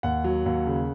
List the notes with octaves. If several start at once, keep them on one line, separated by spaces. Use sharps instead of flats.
D#2 F#5
F#3
D#2
C#3